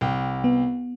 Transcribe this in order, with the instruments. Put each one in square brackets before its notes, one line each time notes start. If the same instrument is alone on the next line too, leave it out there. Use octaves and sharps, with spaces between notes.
[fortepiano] C2 G5
[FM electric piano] B3